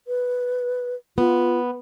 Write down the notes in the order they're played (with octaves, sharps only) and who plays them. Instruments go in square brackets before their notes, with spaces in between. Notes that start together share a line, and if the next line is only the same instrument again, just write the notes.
[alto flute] B4
[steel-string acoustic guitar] B3 [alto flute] F4